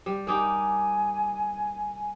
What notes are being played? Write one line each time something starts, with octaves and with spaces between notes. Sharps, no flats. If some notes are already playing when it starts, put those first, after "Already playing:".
G3
A#3 D#4 G4 G#5